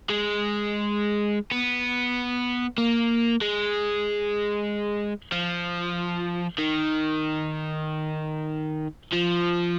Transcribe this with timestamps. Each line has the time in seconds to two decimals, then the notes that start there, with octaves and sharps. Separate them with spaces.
0.09 G#3
1.51 B3
2.78 A#3
3.41 G#3
5.32 F3
6.58 D#3
9.12 F3